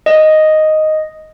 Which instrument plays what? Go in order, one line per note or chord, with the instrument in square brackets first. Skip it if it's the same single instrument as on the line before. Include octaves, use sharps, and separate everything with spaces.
[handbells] D#5